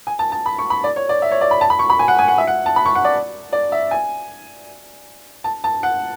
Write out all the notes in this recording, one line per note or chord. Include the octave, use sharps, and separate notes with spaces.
G#5
A5
A5
B5
C#6
B5
D5
C#5
D5
E5
C#5
D5
B5
A5
B5
C#6
B5
G#5
F#5
G#5
F#5
E5
F#5
A5
B5
C#6
F#5
D5
D5
E5
G#5
A5
A5
F#5